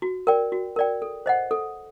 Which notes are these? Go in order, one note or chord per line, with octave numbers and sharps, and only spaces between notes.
F#4
A#4 D5 G5
F#4
A#4 D5 G5
A4
C5 D#5 F#5
A4